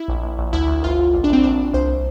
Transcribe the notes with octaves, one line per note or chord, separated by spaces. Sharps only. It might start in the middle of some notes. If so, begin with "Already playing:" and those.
Already playing: E4
A#1
A#1
A#1
D2 E4
D2
G1 F4
G1
A#1
D4
A#1 C4
A#1 D4
A#1
C2 C5